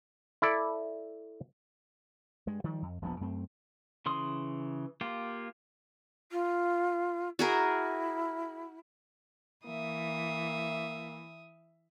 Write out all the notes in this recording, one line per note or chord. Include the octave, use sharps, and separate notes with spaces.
E4 A4 D5
G2 G#3
D#3 F3 G3
F2
D#1 A#1 F3 B3
F#2 A3 C4
C#3 E3 C6 D#6
A#3 F4 G4
F4
E4 F#4 G#4 A#4
E3 A#3 E5 D#6